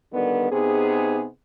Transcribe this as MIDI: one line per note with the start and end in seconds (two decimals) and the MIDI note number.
0.12 0.50 50
0.12 0.50 51
0.12 0.50 55
0.12 0.50 59
0.51 1.26 48
0.51 1.26 59
0.51 1.26 63
0.51 1.26 68